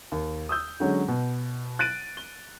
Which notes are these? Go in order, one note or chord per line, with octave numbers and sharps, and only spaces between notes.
D#2
D#6 E6 G6
D3 F#3 G#3 C#4
B2
F#6 A6 D7 D#7
G7